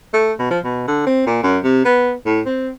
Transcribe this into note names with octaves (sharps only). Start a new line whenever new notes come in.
A3
B2
F3
B2
D3
C4
A#2
F#2
C3
B3
A2
C4